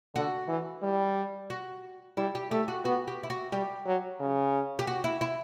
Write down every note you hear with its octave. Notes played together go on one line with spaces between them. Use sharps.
D3 F#4
E3
G3
F#4
G3 E4
G4
A3 G4
F#4
B3 F#4
G4
E4
F#4
G3 G4
F#3
C#3
G4
F#4
E4
E4